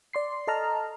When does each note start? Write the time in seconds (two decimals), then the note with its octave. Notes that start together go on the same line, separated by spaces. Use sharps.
0.13 D5 C6 C7
0.47 A4 D#5 A5 A#5 F6